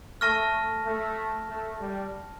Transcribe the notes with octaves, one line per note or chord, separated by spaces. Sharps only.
A3 A5 C#6 F6 A#6
A3
A3
G3